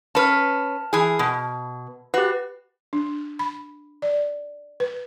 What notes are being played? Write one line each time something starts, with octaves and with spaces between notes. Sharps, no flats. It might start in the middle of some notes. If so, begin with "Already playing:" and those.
C#4 B4 A5 F6
E3 G#4
B2
F#4 G4 B4
D4
B5
D5
B4